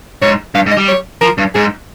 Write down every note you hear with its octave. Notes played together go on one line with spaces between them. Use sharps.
G#2 C#5
G2 F5
G#2
D#5
G3
C#5
F3 A#4
G2
G#2 G#4